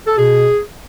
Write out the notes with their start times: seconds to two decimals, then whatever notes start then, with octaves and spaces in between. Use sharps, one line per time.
0.07 A4
0.18 B2 G#4